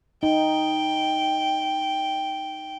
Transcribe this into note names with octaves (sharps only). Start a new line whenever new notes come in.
D#4 G5